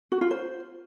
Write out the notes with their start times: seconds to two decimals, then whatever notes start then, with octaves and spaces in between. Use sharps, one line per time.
0.12 F#4
0.21 F4
0.31 C5